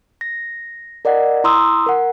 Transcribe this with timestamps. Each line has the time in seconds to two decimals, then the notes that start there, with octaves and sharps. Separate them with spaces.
0.21 A#6
1.05 A#4 D5 D#5 F#5
1.44 E4 A#5 C6 D#6 E6
1.86 A#4 F#5